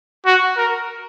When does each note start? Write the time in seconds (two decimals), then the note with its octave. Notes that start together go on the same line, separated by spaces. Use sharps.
0.26 F#4
0.57 A#4